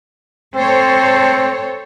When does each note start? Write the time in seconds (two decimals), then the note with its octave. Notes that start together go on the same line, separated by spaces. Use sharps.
0.55 C4 A4 C5 C#5